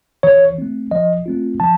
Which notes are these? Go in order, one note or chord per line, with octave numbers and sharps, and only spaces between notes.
E3 C#5
A3 C4
F3 D#5
A3 C4 F4
F3 A5